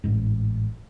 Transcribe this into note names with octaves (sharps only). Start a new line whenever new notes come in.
A1 G#2